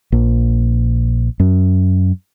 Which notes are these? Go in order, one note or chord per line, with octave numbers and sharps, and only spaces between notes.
A#1
F#2